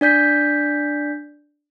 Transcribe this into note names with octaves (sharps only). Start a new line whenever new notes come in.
D4 D5 G6 B6